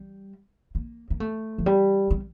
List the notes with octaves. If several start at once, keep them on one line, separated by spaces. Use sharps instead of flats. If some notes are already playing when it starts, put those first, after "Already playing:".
Already playing: G3
A#3
A#3
A3
F3
G3
G3